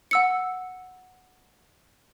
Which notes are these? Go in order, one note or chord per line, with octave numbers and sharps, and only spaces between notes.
F#5 E6 C#7